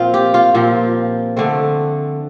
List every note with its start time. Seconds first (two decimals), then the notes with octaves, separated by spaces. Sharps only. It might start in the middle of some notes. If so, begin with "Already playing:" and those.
Already playing: A#2 F3 C4 F4
0.14 G4
0.34 F4
0.54 A#2 F3 C4
1.37 D3 A3 C4